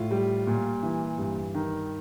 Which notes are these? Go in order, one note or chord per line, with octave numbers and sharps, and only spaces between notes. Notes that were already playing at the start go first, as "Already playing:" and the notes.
Already playing: A2 F4
G3
A#2
E3
G2
D#3